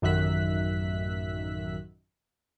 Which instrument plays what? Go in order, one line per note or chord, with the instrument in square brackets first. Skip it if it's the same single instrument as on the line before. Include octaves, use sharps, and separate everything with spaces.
[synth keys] A1 F#2 D#3 E5 F#6 B6